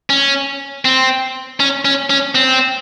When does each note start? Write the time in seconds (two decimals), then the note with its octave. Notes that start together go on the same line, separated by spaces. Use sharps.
0.10 C#4
0.85 C4
1.60 C#4
1.85 C#4
2.10 C#4
2.35 C4